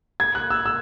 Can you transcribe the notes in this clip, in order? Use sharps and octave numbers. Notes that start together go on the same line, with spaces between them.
G#6
F#6
E6
E6